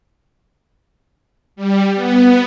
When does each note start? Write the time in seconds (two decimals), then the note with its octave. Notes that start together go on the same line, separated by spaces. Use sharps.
1.56 G3
1.95 B3